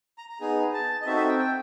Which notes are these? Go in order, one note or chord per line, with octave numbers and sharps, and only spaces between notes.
A#5
A#5
B3 D#4 G#4
A5
D#5
C4 D#4 F#4 A4 E5
E5
G5
G5